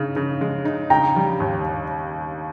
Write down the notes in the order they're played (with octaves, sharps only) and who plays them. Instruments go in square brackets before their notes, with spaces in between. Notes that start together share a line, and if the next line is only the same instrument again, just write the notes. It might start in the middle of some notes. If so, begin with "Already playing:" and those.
Already playing: [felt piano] C#3 D#4
C#3
G#3
D#4
[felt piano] C#3 [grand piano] G5 A#5
[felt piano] G3
D#2